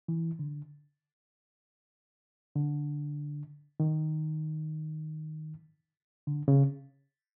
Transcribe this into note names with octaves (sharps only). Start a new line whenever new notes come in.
E3
D3
D3
D#3
D3
C#3